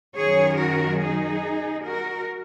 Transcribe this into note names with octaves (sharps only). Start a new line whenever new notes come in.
F#2 D#3 G#4 C#5
F#4 A#4
D#4 G#4
F#4 A#4